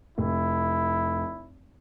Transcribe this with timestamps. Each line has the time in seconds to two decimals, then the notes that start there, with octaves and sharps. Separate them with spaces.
0.18 F1 E4